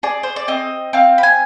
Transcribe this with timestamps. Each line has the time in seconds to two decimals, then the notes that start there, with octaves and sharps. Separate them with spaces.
0.03 G#4 D5
0.23 C5
0.36 D5
0.48 C4 D#5
0.93 C4 F5
1.18 B5
1.23 G#5